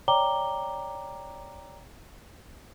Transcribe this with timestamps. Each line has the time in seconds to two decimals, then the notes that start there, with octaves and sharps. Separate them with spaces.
0.08 C#5 D5 G5 A#5 D6 G7